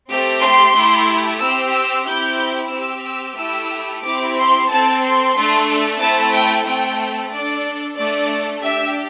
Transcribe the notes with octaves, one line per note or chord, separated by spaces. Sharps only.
A3 C4 G4
C6
A3 E4 G4
C4 G4 E6
E6
C4 E4 G4 G6
C4 G4 E6
E6
A3 E4 G4 E6
C4 E4 G4 D6
C6
C4 A4 A5
C6
A3 D4 A4
A3 C4 E4 A4 A5
G5
A3 C4 A4 G5
D4 A4 D5
A3 D4 A4 D5
D4 G4 E5